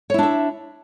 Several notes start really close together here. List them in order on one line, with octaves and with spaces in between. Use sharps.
C#5 E4 D4 E5